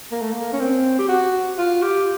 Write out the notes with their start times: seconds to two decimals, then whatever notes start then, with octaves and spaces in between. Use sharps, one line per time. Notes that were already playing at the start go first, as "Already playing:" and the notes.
0.12 A#3
0.21 A3
0.33 A#3
0.53 C#4
0.60 C4
0.99 G4
1.08 F#4
1.58 F4
1.83 G4